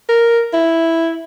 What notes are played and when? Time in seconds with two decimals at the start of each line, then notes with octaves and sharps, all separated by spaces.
0.09 A#4
0.54 E4